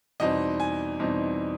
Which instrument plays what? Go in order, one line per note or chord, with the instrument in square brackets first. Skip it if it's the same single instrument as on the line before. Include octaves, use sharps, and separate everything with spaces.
[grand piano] E2 B2 G3 C4 D#4 D#5
G#5
E2 B2 G3 C4 D#4